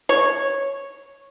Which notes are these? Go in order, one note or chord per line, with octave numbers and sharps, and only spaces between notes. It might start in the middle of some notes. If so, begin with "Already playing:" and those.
C#5